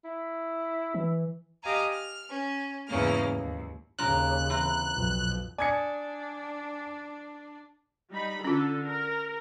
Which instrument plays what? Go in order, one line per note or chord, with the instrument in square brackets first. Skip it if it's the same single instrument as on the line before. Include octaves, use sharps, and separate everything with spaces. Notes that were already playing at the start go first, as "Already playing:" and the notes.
[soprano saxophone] E4
[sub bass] E3
[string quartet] G4 D#5 F5 G#5 A#5
F6
C#4
E2 G#2 C#3 A#3 C#4 F6
D#2
[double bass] D#2 C#3 [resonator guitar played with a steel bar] A#2 D4 A#5 [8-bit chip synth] F#6
[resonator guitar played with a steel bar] E3 C4 A#5
[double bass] B1 F2
[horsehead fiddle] D4 [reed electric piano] D5 D#6 [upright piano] G#5 G#6 C#7
[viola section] G3 D#4 B5
[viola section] D3 A4 [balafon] C#4 F4
[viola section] A#4